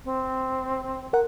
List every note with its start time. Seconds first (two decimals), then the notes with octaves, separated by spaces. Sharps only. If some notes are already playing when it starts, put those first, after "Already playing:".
0.05 C4
1.13 A#4 F#5